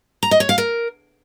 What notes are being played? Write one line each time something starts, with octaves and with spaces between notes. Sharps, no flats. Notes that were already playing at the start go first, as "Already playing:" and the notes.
A#5
D#5
C#5
F5
A#4